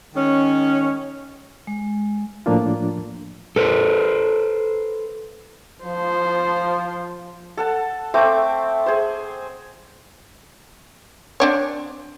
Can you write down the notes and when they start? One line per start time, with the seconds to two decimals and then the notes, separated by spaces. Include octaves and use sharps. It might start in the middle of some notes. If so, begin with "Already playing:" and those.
0.16 D#3 G#3 C#4
1.67 G#3
2.46 A2 F3 A#3 D4 F4
3.56 A4 B4 C5
5.84 F3 C5
7.57 A4 F#5 A5
8.14 A3 C4 D6
8.86 G#4 C5
11.40 C4 D4 C#5